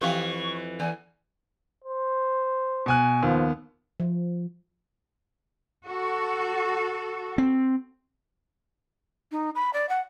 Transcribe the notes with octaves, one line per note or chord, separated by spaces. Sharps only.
F2 E3 G4 B4 F5 G5 C#6
E2 G#5
C5
B2 G#5 F#6
D#2 F3 B3
F3
F#4 A4
C4
D#4
B5
D5
F#5